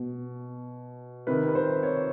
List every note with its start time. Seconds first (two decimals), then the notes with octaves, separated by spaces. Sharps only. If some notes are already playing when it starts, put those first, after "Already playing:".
Already playing: B2
1.27 C3 D#3 B4
1.49 B4
1.55 C5
1.83 C#5